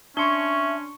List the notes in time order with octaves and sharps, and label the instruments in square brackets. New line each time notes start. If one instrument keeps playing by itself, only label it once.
[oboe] C#4 [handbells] D4 C6 [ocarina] E5 [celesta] C#6 C#7 G7